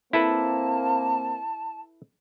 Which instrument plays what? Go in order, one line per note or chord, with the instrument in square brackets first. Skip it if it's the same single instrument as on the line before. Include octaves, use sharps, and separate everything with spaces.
[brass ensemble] A#3 C4 [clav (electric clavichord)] E4 A4 B4 [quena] A5